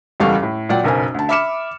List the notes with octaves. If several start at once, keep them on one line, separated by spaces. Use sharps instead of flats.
F#1 E2 G3 A4 F5 C#6
A2
A#2 F#3 D5 F#5 G5
F#1 B1 A#4 C5 G#5
D2 A5
E5 B5 D6 F6 C#7 E7